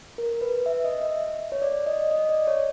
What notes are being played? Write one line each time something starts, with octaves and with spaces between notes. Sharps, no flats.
A#4
B4
E5
D#5
E5
C#5
D5
D#5
D#5
D5
C#5